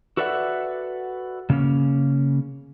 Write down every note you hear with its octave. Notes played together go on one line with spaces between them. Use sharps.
F#4 A4 B4 D5 E5 F#5
C#3 A#3 C#4